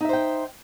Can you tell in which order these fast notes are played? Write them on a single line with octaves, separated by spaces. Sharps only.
D#4 E5 C5 G5